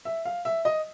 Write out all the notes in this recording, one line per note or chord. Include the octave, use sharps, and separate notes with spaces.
E5
F5
E5
D#5